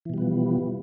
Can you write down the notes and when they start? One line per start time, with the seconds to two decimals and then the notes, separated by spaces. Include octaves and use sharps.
0.05 E3
0.10 B2
0.14 G3
0.18 B3
0.22 F3